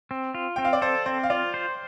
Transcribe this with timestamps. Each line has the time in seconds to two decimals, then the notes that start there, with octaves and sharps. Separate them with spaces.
0.11 C4
0.34 F4
0.56 C4 G5
0.65 F5
0.73 D5
0.82 A4 C5
1.06 C4 C5
1.23 F5
1.30 F4 D5
1.54 C5